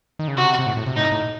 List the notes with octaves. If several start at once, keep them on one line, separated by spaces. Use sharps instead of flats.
D#3
C#3
C3 F#4
C3
A2
A2
C3
A2 D#4
A2